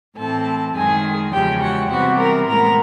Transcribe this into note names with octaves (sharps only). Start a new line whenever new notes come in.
A2 E3 A3 C4 A4 A5
F#2 D#3 G#3 G#4 G#5
E2 C#3 F3 G#3 G4 G5
F#4 F#5
C3 E3 G3 B3 F#4 F#5
A#4 A#5
A2 E3 G#3 B3 A#4 A#5